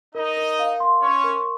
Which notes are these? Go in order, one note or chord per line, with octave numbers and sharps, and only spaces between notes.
D#4 A#4 D#5
A#4
F5
C6
C#4 C#5 C#6
A#4